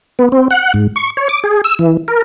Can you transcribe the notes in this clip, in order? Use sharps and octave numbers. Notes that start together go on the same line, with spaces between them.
B3
C4
F#5
G#2
C#6
C#5
D6
G#4
E6
E3
A#4